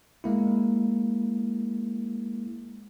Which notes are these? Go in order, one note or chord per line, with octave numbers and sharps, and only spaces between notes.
G#3 A#3 E4